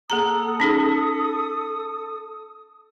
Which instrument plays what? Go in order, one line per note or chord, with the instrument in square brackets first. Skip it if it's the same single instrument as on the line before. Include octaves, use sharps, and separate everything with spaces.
[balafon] A#3 G#4 A#5 [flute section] A4 D#6
[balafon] C#4 D#4 G#4